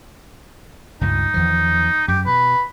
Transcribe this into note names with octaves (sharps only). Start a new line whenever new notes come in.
C#2 G2 A#2 D#4
E2 D#3 F3
F#2 G4
B2 B4